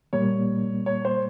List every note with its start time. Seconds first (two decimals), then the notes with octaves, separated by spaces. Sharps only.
0.13 A#2 G3 A#3 C#5
0.86 C#5
1.05 C5